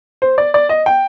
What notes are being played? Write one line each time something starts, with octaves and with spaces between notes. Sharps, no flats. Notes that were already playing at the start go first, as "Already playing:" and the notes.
C5
D5
D5
D#5
G5